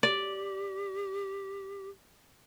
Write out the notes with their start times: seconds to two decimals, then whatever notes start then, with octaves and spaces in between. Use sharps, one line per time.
0.03 G4 D5